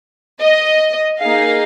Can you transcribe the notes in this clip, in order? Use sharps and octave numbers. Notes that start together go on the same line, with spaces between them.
D#5
A#3 D#4 G#4 F5